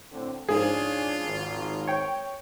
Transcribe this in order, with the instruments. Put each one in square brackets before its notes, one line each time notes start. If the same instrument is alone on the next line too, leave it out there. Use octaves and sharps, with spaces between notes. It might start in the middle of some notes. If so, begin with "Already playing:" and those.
[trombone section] A2 D3 C4
[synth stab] G#2 F3 [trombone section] C#4 D4 [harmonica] F4 [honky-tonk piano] G#4
[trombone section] G#1
[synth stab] C#5 G5